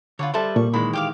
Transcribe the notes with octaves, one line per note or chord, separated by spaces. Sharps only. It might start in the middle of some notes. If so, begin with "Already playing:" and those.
D3 F4 B4 C#5
G3 A4 B4 C5 E5 A5
A#2 C#6
D#3 E3 G#3 B5
G4 F5 D6